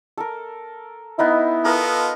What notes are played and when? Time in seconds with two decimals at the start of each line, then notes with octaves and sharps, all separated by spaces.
0.17 A4 A#4
1.19 B3 D#4 E4 F5
1.65 B3 F4 A4 A#4 D#6